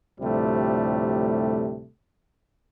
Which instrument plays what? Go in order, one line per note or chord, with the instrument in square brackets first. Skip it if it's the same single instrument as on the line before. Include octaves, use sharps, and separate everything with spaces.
[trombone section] D2 A2 C3 F3 G3 A3